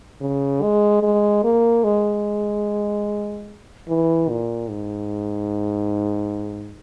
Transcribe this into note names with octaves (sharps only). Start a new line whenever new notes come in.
C#3
G#3
G#3
A#3
G#3
E3
A#2
G#2